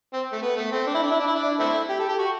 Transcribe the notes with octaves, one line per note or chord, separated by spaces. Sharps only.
C4
A3
B3
A3
C4
D4
E4
D4
E4
D4
E4
D4
A3 C4 E4
G4
A4
G4
F#4